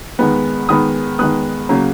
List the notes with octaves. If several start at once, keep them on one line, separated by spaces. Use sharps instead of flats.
D#3 G#3 B3
D#3 G#3 B3 B5 D#6
D#3 G#3 B3 D#6 F#6
C#3 F#3 A#3